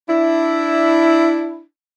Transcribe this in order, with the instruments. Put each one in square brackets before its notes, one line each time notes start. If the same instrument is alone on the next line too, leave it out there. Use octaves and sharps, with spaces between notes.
[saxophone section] D4 E4